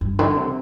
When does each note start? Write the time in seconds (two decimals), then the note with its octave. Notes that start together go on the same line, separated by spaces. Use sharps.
0.01 G2
0.19 D3
0.37 C3